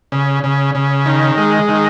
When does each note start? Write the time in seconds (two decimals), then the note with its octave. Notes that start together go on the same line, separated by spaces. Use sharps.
0.12 C#3
0.43 C#3
0.75 C#3
1.06 D#3
1.38 G#3
1.69 D#3